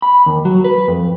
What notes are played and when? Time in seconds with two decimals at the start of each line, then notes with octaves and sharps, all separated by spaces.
0.02 B5
0.26 D#2
0.45 F#3
0.64 B4
0.88 F2